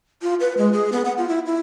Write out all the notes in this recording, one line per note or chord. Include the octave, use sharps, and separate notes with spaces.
F4
B4
G#3
G#4
B3
F#5
F4
E4
E4